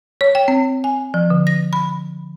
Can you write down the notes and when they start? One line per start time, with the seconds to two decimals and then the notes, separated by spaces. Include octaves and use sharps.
0.21 C#5
0.35 G5
0.48 C4
0.84 G#5
1.14 F3
1.30 D3
1.47 A#6
1.73 B5